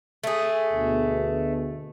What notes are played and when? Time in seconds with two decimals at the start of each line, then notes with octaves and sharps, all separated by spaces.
0.23 A3 G#4
0.72 D2 B2